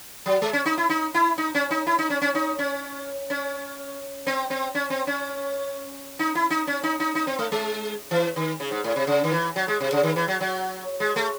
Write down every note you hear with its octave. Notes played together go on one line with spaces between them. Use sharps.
F#3
G#3
C#4
D#4
E4
D#4
E4
D#4
C#4
D#4
E4
D#4
C#4
C#4
D#4
C#4
C#4
C4
C4
C#4
C4
C#4
D#4
E4
D#4
C#4
D#4
D#4
D#4
C4
A3
G#3
E3
D#3
C#3
G#2
A2
C3
C#3
D#3
E3
F#3
G#3
C3
C#3
D#3
E3
F#3
F#3
G#3
A3